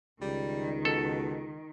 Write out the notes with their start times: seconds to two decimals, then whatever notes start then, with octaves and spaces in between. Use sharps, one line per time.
0.21 C#2 D#3 G3
0.85 B2 A4